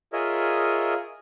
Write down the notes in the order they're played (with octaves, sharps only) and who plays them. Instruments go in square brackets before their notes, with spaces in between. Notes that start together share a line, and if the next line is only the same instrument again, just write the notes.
[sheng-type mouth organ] F4 G#4 A#4 C#5 D#5 E5